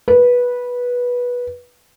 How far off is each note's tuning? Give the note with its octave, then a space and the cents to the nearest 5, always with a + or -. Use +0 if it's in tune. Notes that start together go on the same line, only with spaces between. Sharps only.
B4 -15